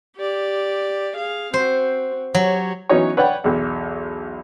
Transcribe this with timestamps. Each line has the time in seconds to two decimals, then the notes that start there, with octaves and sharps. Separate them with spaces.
0.17 G4 D5
1.16 G#4 F5
1.54 C4 F#4 C5
2.34 F#3 G4 C#5
2.89 E3 F#3 B3 C#4 D#4 C#5
3.17 B4 C#5 D5 F#5 G5 B5
3.44 B1 E2